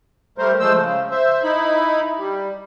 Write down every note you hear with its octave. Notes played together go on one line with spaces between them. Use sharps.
G3 A3 A#4 C5
F3 G#3 A3 C5 E6
C#3
C5 E5
D#4 E4 B5
G3